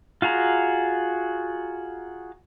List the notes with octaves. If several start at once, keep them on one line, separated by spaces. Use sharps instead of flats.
F4 F#4 G#4 A#5